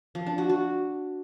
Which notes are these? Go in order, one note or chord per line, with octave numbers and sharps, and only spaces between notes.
F3
D4
F#4
F#4